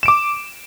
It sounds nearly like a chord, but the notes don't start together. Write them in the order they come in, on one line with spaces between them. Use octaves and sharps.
E7 D7 D6